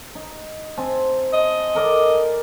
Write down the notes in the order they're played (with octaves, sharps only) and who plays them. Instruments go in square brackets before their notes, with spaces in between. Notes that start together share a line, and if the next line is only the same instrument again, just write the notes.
[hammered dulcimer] D#4
C4 G#5 A5
[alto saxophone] D#5
[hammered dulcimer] A4 A#4 D5